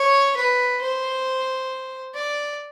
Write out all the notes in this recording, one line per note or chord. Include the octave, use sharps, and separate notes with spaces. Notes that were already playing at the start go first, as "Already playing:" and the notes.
Already playing: C#5
B4
C5
D5